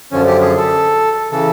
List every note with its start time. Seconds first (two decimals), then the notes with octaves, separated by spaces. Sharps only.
0.12 F#2 D3 F3 C#4
0.27 G4
0.42 G#4
0.57 A4
1.32 C#3 E3 A4